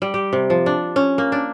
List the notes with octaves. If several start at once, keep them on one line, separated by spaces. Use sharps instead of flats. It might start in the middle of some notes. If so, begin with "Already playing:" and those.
G3
G4
C3
F3
D4
C#4
A#3
D4